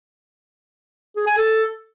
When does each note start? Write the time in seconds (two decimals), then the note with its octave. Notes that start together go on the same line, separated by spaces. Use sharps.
1.16 G#4
1.27 G#5
1.37 A4